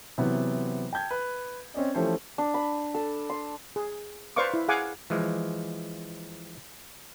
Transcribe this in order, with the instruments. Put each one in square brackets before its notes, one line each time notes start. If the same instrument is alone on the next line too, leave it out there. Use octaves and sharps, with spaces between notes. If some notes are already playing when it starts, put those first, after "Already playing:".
[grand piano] C3 E3 F#3 B3
G5 A5 G6 G#6
B4
C4 C#4 D5 D#5
E3 F3 A3 C#4 G4 C5
[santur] D4
B5
A4
C6
[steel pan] G#4
B4 C5 D5 F5 C#6 D6
E4
G#4 F5 F#5 G#5 D6
[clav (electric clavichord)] E3 F3 G#3